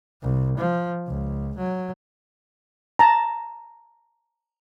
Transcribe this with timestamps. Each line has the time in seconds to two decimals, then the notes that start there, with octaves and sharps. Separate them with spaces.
0.22 C2
0.58 F3
1.07 C#2
1.58 F#3
2.99 A5 A#5